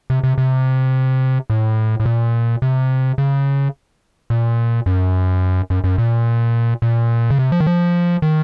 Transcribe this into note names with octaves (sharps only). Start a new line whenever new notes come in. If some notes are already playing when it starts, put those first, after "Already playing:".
C3
C3
C3
A2
A2
A#2
C3
C#3
A#2
F#2
F#2
F#2
A#2
A#2
C#3
C3
F3
D#3
F3
D#3